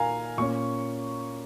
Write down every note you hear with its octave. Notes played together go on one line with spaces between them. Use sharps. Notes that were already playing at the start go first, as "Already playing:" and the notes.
Already playing: A#2 D#4 A#4 F5 G#5 A#5
A#2 A#3 C#4 C#6